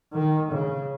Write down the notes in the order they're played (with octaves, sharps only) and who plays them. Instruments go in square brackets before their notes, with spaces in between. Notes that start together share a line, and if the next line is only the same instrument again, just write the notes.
[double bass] D#3
C#3